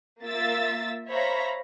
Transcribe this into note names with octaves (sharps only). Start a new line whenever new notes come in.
A#3 F4 E5 E6 A6
C5 C#5 E5 F5 A#5 B5